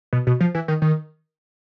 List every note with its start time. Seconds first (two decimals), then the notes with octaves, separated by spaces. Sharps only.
0.13 B2
0.27 B2
0.41 F3
0.55 E3
0.68 D#3
0.82 D#3